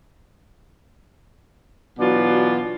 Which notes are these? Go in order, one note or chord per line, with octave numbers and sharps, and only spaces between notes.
B2 E3 F#3 D4 F4